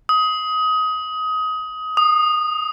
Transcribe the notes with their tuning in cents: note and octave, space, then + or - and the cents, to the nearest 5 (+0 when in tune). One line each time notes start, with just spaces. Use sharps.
D#6 +20
D#6 -20